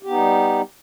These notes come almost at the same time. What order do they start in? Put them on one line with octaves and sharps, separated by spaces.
G4 B3 D#4 G3